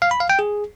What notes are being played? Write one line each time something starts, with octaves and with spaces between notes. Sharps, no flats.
F5
B5
F5
G5
G#4